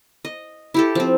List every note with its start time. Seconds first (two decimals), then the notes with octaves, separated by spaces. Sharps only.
0.25 D#5
0.74 E4 G4 A4
0.95 F3 C4